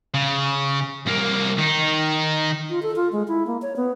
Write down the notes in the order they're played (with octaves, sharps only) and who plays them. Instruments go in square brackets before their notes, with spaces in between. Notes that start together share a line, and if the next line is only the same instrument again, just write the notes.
[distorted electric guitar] C#3
C2 A#3
D#3 D#4
[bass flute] F4
A4
F4
G#3
E4
A#3
C#5
B3